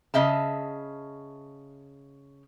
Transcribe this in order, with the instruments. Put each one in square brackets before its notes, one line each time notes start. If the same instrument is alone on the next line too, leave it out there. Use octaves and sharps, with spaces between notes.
[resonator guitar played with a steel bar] C#3 D#5 E5 A5